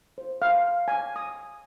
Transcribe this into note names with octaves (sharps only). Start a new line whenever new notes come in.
C5
F5
G#5
D#6